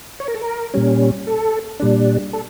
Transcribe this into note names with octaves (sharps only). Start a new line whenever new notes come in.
C#5
A#4
A4
A#4
A#2 G3 C#4
A4
A#2 G3 D4
A4